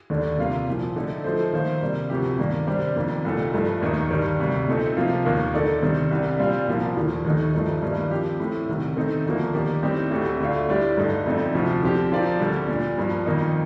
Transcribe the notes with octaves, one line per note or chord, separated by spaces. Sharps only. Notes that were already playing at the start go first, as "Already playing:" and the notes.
D#2 D3 A3 D4
C3 G3 A#3 F4
C2 A#2 F3
D3 A3 D#4 A4
F3 A3 D#4 A4 C5
D#3 A#3 F4 C5
C3 G3 A#3 D4
D2 C3 F3 C4 G4
G2 D#3 A#3 D4
C3 G3 D4 G4 C5
F2 D#3 A#3 D4
C2 A#2 A3 D#4 A4
G2 F3 A3
D#2 D#3 A#3 D#4
G2 D#3 G3
D2 C3 G3
A#2 A3 C4 D#4 A4
C3 F3 A#3 F4
D#2 D#3 A#3 F4
D3 A3 D#4 A4 D5
C3 D#3 G3 C4
C2 C3 G3 D4
A#2 G3 C4 F4
C2 A#2 F3 A#3 F4
D#2 D3 F3
D#2 D#3 A3 D#4
G2 F3 A3 D#4
G2 D#3 G3 A#3
F3 C4 G4
A2 A3 C4
C2 C3 D#3
D#3 A3 C4 D#4
D2 D3 F3 A#3
D#3 A#3 D#4 G4 D5
A2 G3 C4 D#4 G4
D2 D3 A3 C4 G4
D2 D3 A3 D4 F4
A2 G3 D4 G4 D5
G2 D3 A3 D#4
F2 D3 A3 C4 D#4
D2 C3 F3
D3 F3 C4 G4
F3 C4 F4 A#4 D5
D2 D3 G3
A#2 G3 D4
G2 F3 A#3
F2 D#3 A#3 D#4